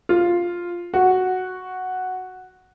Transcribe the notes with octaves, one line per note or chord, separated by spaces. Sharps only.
F4
F#4